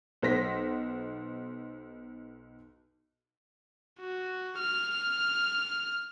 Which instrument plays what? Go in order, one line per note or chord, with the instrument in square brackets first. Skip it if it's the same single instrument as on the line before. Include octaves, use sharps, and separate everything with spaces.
[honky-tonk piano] B1 C5 A#6 B6
[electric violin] F#4
F6